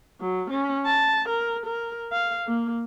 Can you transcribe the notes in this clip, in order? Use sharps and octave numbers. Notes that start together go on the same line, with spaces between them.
F#3
C#4
A5
A#4
A#4
F5
A#3